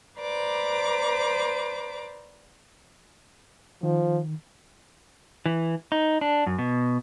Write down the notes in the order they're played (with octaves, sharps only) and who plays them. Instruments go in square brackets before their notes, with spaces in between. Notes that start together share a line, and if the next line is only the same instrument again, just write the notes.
[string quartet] B4 C5 D5 A#5 D6
[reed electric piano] D#3 [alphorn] F3
[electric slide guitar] E3
D#4
D4
F#2
B2